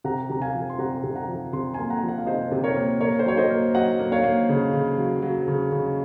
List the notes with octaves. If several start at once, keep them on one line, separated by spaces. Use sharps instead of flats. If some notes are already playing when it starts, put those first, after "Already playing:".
C3 F#5 A#5
C3 A#5
F5 G#5
F3
C6
C3 F#5 A#5
C3
F#5 A#5
F3
C3 C6
A#3 G#5 C6
F#5 A#5
F3
F#5
F5
C3 C5 D#5
C3
A#4 C#5
A#3
A#3 A#4 C#5
C5
F#3 C#5
C5 D#5
A#3
F#3 D#5 F#5
A#3
C#5 F5
A#3
C#3
C#3
F#3
F#3
C#3
C#3